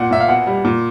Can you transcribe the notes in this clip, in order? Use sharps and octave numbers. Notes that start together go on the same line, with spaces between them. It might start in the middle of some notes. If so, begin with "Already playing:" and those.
Already playing: A#2 F#5
A#2 E5
F5
B2 F#5
G3
A#2